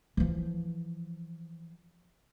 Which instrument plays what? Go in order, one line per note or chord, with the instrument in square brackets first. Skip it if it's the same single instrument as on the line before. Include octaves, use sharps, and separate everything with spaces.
[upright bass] E3 F3